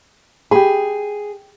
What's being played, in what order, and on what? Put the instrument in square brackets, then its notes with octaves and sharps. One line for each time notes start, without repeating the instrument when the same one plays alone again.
[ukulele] G4 B5 [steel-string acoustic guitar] G#4